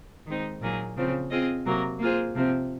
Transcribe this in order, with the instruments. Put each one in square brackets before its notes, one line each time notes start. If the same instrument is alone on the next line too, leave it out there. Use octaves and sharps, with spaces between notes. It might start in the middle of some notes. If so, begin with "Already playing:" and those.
[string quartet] D#3 G#3 C4 D#4
A#2 F#3 A#3 D#4 G#4
C#3 F3 C4
C4 F4 G#4 D#5
C3 F#3 A#3
A#3 F4 G#4 C5
C3 F3 C4